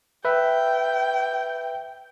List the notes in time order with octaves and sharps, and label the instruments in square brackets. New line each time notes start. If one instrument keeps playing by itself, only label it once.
[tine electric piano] B4 E5 [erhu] G5